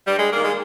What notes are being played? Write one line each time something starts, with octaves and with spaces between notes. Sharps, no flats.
G2 G3
G#3
D#3 A#3
G#3